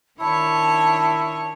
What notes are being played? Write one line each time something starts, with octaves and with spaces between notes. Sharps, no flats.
D#3 D4 E4 C#5 A5